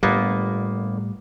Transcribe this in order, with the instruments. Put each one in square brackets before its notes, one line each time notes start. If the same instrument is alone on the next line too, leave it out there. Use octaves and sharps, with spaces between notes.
[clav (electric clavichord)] G1 A#3 B3 [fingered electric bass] A2 G3